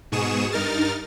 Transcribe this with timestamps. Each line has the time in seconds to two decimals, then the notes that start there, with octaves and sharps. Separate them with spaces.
0.12 G#2 B2 G#4 C#6 D#6 E7
0.52 G2 D#4 A#4 F6 A6